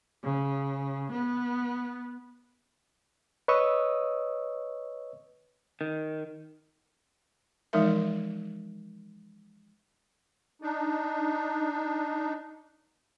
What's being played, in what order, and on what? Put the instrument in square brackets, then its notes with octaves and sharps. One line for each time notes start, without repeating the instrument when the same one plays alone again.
[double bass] C#3
B3
[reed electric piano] B4 C#5 D#5 C#6 D#6 E6
[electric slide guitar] D#3
[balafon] E3 F3 G#3 D#4 A#4 E5
[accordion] D4 D#4